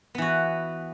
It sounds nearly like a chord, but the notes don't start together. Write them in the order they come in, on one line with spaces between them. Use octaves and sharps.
B3 E3 F#4